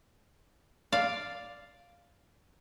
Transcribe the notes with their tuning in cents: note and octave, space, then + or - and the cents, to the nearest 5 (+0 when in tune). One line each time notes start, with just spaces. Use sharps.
D5 +0 F5 +0